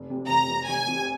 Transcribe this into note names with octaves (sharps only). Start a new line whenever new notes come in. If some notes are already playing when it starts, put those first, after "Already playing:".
Already playing: F1
F2 C3
F1 A#5
F2 C3
F1 G#5
F2 C3